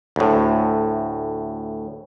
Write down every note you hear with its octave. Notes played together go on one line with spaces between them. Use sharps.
D2 A2